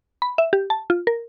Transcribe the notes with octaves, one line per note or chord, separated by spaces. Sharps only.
B5
E5
G4
A5
F4
A#4